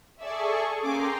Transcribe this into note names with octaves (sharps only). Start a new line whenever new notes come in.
G#4 A4 D5 E5 C#6
A#3 C#4 G#4 G5 A#5 C6 D6